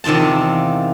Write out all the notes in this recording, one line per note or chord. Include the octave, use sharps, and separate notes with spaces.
E2 C3 D#3 F4 A5